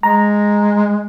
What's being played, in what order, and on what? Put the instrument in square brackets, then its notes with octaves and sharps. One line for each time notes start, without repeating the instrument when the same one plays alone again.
[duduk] G#3 [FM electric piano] A#5